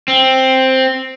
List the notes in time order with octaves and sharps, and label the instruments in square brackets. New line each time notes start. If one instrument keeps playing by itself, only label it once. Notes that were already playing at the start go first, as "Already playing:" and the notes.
[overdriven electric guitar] C4